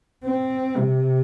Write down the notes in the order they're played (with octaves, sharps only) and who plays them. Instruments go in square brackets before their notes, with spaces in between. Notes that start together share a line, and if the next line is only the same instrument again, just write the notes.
[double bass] C4
C3